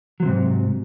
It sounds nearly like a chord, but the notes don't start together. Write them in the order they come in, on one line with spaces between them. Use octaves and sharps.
F#3 F3 C3 G#2